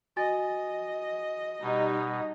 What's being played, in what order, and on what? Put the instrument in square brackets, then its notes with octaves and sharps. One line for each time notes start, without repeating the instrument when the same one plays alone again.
[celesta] F#4 G#5 A6 [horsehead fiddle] D#5
[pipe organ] B2 [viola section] G3 D#4